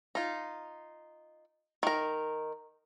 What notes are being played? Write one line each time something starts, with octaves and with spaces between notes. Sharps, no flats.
D#4 F4
D#3 A#4